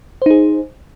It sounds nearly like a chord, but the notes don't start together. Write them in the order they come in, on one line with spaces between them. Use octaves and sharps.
C5 D#4 G#4